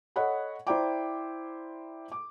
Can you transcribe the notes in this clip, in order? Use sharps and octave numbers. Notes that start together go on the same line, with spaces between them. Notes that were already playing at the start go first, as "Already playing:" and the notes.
A4 C#5 D#5 F#5 B5
E4 C5 D5 G5 A#5 D6
D6